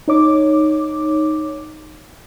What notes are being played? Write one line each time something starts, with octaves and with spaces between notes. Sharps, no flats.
D#4 C#5 D6